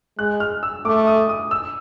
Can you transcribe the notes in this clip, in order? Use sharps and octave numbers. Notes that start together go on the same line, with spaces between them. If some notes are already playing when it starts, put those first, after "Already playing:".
G#3 F#6
F6
E6
A3 D6
D#6
D#6
E6